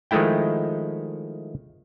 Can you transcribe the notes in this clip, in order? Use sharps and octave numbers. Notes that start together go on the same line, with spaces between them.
D#3 F3 G#3 A3 E4 G5